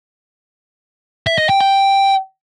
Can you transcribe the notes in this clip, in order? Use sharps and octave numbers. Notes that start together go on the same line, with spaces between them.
E5
D#5
G5
G5